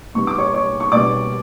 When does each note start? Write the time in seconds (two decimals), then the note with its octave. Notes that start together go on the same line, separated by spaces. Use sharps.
0.14 B1 B2 G3 B3 C#6
0.27 D6
0.38 C#5 C#6
0.54 C#5 C#6
0.80 C#6
0.92 B1 B2 G3 B3 D5 D6